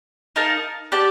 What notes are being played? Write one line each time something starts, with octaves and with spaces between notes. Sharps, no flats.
D#4 A#4 F5 A5
G4 D5 A5